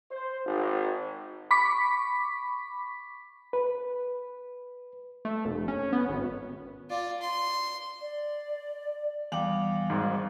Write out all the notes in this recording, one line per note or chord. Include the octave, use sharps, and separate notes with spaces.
C5
G#1
B5 C#6 D6 B6
B4
A3
F1
C#4
B3
G#1
F4 D5
C6
D5
E2 G3 F5 G5 D6 F#7
G#1 G#2